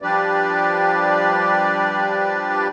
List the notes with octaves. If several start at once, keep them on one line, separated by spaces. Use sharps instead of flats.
F3 G3 D4 G4 B4 D5